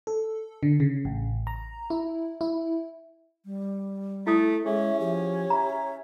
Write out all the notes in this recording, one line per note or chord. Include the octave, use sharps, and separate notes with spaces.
A4
D3
C#3
A1
A#5
E4
E4
G3
A3 E4 A4 D#6
G#3 C#4 G#4 E5
F3 G4
E5 A#5